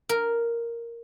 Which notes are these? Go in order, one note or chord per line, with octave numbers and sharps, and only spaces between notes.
A#4